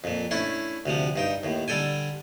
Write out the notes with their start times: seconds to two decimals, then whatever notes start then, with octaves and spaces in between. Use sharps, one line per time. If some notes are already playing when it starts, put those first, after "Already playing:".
0.04 F2 A#2
0.31 A3 C#4 D4 E4
0.86 D2 C3 F3
1.16 G2 D#4 G5
1.43 D#2 A2
1.68 D3 G3 A4 G5 G#5